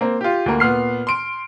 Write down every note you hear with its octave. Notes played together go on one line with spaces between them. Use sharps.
A#3 C4
F4 G4
D2 A#3
A#2 B3 F6 C7
C6 D7